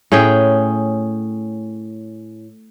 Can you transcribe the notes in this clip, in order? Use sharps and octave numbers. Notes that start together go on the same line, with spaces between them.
A2 C#4 G#4 G5